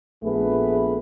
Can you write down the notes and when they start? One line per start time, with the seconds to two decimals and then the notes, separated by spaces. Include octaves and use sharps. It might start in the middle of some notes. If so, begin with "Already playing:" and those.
0.22 A#1 A3 B3 G#4 B4